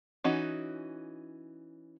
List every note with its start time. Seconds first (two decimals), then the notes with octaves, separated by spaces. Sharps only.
0.24 E3 C#4 D#4 F#4